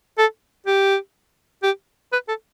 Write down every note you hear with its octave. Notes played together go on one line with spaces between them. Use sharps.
A4
G4
G4
B4
A4